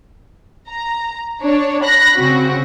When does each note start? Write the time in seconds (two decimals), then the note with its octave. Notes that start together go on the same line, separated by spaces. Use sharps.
0.70 A#5
1.41 D4 C#5
1.84 B5 F#6 A#6
2.17 C#3 C4 F#4